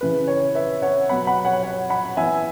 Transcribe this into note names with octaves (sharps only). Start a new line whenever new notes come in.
C#3 E3 C#4 B4
C#5
B4 E5
C#5 F#5
B2 F#3 B3 F#5 B5
F#5 B5
C#5 F#5
C#5 F#5
F#5 B5
E3 B3 E5 G#5